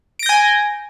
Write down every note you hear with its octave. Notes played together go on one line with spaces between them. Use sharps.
G#5 G6 A#6 D7